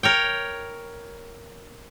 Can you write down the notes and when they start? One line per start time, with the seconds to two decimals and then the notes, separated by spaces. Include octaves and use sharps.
0.03 A#4 C#5 G5